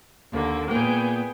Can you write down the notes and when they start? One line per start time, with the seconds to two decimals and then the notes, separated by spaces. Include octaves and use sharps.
0.34 D#2 D3 A#3
0.71 A#2 A#3 B3 G#4 G5